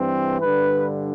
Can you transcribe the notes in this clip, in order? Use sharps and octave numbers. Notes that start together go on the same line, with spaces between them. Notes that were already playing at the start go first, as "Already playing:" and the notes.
Already playing: G2 E3 C4
G2 D3 B4